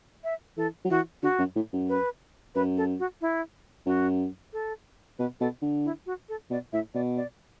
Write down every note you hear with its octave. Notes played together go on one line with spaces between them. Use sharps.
E5
E3 A4
F#3
E3 F#4
D3 F#4
F#2
A2
F#2
B4
F#2 B4
A4
F#4
E4
F#2 F#4
A4
B2 B4
B2 A4
D3
E4
F#4
A4
B2 D5
A2 E5
B2 D5
D5